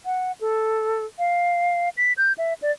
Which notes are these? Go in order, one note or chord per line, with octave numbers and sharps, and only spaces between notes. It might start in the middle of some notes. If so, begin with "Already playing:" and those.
F#5
A4
F5
B6
G6
E5
D5